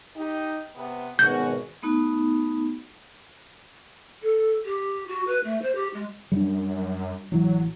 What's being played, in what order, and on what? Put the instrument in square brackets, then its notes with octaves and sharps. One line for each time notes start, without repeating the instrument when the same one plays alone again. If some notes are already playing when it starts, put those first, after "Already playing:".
[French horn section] D#4 G4
C3 B3
[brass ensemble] G#1 B2 [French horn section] C#4 F#4 [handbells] G6
[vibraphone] A3 B3 D#4 F#4
[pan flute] A4
G4
F#4
B4
A3
C5
G4
G#3
[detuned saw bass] F#2 [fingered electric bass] G3 D4
[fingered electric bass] A1 E3 [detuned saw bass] F#3